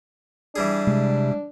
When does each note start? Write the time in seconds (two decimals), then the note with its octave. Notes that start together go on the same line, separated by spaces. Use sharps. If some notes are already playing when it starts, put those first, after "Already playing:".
0.56 E3 G3 D4 G#4
0.87 C3 G#3